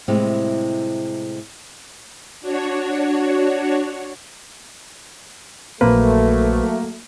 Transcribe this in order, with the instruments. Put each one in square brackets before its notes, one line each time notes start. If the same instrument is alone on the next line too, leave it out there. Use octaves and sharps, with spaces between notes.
[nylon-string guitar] A2 C3 G3 G#3 E4
[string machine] D4 F#4 C#5
[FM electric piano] A#1 C5 [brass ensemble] F#3 A3 [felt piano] A#3 [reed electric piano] B4